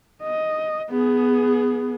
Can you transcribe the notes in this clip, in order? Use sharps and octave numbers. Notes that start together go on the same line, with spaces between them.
D#5
B3 G#4